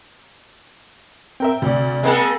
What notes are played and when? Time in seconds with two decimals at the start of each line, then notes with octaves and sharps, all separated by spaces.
1.40 C4 A#4 E5 G5
1.62 D2 C3 D5
2.03 G#3 A#3 C4 G#4 A4